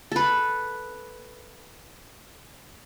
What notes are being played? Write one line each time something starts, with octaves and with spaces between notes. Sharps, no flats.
A4 B4